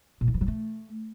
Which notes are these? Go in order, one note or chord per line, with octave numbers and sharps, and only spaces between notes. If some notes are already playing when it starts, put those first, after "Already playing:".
A#2
D#3
E3
F#3
A3